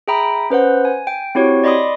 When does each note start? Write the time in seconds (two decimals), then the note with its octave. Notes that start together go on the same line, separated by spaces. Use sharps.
0.08 G#4 E5 G5 A#5 B5 D#6
0.50 C#4 B4 C5 F#5
0.85 G#5
1.07 G5
1.35 C4 E4 F#4 G4 C#5
1.64 D5 D#5 B5 C6 D6 D#6